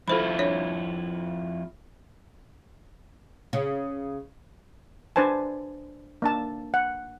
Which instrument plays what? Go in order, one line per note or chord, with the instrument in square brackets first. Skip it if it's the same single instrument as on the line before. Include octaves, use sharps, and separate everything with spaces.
[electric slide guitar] F2 E4 F4 [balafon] A4 C5 B5
[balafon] D4 C#5
[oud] C#3
[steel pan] D4 B4 C5 G#5 A5
A#3 D4 A5
F#5